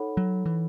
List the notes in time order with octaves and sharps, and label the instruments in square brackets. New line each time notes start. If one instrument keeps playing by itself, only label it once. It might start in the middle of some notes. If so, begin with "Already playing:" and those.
Already playing: [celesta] D#4 A4 C#5 F#5 B5
[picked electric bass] F#3
E3